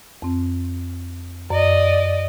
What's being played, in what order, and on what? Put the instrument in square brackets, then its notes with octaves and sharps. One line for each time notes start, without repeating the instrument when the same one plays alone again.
[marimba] F2 C4
[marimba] F#2 [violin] D5 D#5